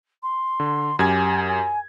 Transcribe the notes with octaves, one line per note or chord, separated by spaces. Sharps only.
C6
D3
F#2 G4 G#5 G#6
G#5